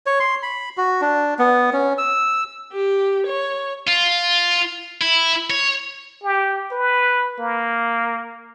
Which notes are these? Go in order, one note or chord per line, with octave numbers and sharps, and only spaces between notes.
C#5
C6
B5
F#4
D4
B3
C#4
E6
G4
C#5
F4
E4
C#5
G4
B4
A#3